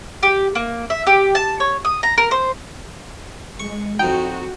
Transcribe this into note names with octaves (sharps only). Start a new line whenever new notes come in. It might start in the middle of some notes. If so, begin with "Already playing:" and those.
G4
A#3
E5
G4
A5
C#5
D#6
A#5
A#4
C5
G#3 C#6
F2 D#4 F#4 G5